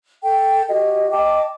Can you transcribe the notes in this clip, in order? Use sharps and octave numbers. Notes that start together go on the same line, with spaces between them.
A4 G5
F#4 G4 D#5
D#5 G5 A5 D6